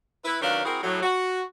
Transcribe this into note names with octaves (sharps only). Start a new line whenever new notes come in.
E4 B4
D#3 F#3 C#4 D4 B4 F5
C4 E4 F#4 G#4 A#4
A2 F#3
F#4